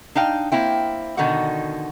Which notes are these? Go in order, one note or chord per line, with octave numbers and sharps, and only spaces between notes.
D4 D#4 F5 G5
A#3 C4 E4 G5
B2 D3 D#3 D#4 F#4 F#5